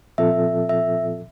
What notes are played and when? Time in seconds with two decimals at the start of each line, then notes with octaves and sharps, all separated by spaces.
0.18 A#2 F3 C4 F4 A4 E5
0.69 E5